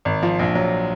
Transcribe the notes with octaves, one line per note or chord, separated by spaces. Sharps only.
G#1
F3
A#1
F#3